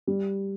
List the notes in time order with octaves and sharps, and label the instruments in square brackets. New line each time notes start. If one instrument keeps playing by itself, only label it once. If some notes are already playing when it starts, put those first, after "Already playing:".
[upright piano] G3